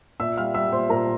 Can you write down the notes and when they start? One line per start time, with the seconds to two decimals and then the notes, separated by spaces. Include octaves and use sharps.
0.20 A#2 E5 E6
0.37 G3 F5 F6
0.54 G3 E5 E6
0.72 A#2 C5 C6
0.90 A#2 A#4 A#5